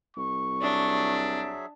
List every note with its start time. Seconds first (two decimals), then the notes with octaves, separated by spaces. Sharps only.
0.17 C2 C#6
0.62 F#3 D4 G#4 E5